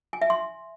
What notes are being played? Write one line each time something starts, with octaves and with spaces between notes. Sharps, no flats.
G#5
E5
C6